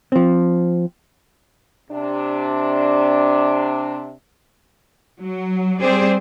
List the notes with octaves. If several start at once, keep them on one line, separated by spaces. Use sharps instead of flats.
F3 C4
C3 D4
F#3
G3 C4 G#4 C5 D5